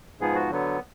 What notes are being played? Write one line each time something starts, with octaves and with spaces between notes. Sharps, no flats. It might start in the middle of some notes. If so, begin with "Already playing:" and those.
G#2 F3 B3 G#4
F#4
D3 F#3 B3